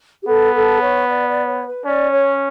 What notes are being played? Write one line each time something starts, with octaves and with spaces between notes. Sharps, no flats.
G4
B3 A4
A4
C#5
D5
D5
C#5
B4
C#4 D5
C#5